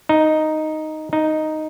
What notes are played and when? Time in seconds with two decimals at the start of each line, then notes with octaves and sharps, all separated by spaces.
0.09 D#4
1.13 D#4